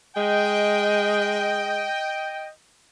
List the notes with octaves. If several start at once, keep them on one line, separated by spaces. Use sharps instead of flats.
G#3 D#5 G5